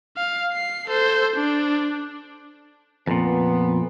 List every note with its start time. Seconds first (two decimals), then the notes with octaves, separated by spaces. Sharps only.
0.17 F5
0.52 C7
0.87 A4 C5
1.36 D4
3.07 F2 A#2 B3